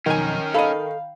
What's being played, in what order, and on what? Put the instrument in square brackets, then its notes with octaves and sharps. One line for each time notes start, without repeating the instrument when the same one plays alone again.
[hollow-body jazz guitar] B1 F2 G#5 [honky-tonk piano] D#3 [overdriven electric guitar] C#4 A#4
[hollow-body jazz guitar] A4 D#5 [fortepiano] F5 B5